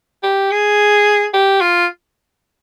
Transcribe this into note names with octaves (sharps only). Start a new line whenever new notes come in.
G4
G#4
G4
F4